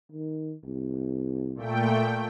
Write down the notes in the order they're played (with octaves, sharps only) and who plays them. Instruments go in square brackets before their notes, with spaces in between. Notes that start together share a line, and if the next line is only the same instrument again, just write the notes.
[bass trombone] D#3
C2
[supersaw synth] A#2 A3 G5